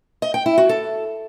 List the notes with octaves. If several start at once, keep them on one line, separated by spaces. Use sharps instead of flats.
D#5
G5
E4
F#4
A4